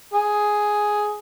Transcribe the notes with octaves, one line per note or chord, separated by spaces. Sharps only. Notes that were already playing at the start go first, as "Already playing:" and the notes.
G#4